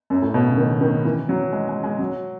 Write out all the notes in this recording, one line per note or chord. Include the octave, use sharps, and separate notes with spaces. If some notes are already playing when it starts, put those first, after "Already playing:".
F#2
A2
B2
C#3
D#3
D#3
E3
F#3
G#3
G#3
G#3
F#3